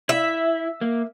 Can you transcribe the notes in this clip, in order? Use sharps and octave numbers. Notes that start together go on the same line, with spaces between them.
E4 E5
A#3